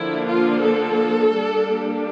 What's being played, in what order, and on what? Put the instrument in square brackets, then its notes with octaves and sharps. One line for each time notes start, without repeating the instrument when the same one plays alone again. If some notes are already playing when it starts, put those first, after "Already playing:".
Already playing: [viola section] D3 F3 A#3 D4 E4
F4
A4
G3 A#3 D4